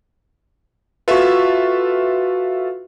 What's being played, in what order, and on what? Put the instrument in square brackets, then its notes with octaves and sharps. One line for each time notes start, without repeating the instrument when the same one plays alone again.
[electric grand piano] F4 A4 E5 [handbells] F#4 B4